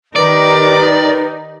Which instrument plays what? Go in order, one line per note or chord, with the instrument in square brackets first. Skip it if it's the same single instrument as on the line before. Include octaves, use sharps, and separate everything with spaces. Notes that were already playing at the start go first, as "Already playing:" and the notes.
[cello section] D#3 A#4 [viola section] D#4 G4 [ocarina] B4 [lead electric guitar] D5